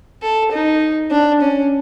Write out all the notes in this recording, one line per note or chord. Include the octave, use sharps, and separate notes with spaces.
A4
D#4
D4
C#4